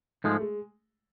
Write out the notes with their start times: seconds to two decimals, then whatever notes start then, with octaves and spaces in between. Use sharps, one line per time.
0.24 G#2 F3 G#3 A3
0.40 G#3